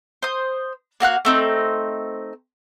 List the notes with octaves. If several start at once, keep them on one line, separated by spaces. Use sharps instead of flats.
C5 D#6
A#3 F#4 F5 F#6
A3 C4 D#4